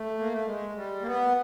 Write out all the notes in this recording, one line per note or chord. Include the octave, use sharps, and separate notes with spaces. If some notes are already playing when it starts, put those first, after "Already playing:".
Already playing: A3
A#3
A3
G#3
G3
A#3
B3